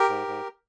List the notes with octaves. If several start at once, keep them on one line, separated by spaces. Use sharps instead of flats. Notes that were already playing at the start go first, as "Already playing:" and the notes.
Already playing: G4 A#4
G#2
G#2